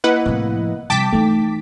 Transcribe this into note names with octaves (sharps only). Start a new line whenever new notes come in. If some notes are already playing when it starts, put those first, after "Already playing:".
A#3 E4 B4 D#5 F#5
A2 C3 F3
C3 G3 G5 A5 D6 B6
E3 A3 D#4